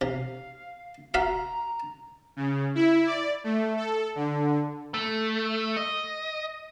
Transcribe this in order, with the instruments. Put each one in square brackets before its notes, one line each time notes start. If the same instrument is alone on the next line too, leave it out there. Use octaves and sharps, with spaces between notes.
[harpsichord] C3 [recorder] F5
[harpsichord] F#4 E5 F5 [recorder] A#5
[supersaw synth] C#3
E4
D5
A3
A4
D3
[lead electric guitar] A3
D#5